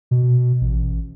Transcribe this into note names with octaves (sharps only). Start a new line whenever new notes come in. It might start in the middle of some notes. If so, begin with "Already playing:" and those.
B2
A1